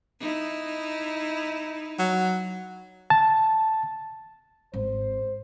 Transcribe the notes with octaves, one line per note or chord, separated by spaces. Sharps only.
D#4 E4
F#3
A5
G#1 C5